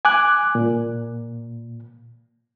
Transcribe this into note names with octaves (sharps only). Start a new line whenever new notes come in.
G#5 D6 F#6
A#2